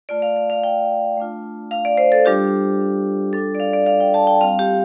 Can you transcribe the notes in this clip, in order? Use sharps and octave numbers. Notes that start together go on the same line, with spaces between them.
A3 F4 D5
F5
F5
F5
G5
A3 D4 F4
F5
D5
C5
A4
G3 D4 F4 G4
G3 D4 F4 A4
D5
F5
D5
F5
G5
A5
G5
G3 C4 F4 F5
G4